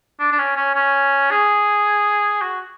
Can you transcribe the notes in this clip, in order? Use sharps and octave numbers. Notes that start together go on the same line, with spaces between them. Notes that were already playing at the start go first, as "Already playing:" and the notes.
D4
D4
C#4
C#4
C#4
G#4
F#4